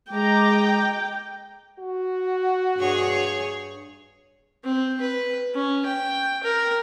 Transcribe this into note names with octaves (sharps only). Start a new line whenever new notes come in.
G#3 D#5 G5 A#5 D6
F#4
G2 G#4 C#5
C4
B4
C#4
G5
A#4